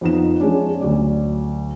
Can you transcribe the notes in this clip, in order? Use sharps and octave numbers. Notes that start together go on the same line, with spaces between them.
F2 F3 B3 D#4 E7
F3 G#3 C#4 D4
D2 F#3 D5